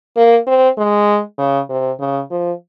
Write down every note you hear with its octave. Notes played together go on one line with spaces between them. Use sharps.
A#3
C4
G#3
C#3
C3
C#3
F3